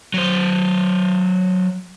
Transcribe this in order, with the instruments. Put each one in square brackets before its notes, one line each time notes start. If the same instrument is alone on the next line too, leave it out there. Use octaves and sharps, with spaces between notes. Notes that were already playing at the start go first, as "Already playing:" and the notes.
[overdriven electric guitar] F#3 C5